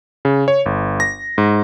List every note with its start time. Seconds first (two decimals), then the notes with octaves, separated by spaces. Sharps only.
0.25 C#3
0.48 C#5
0.66 G1
1.00 A#6
1.38 G#2